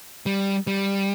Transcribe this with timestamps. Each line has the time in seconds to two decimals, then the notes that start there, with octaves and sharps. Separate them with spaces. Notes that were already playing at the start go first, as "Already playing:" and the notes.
0.26 G3
0.67 G3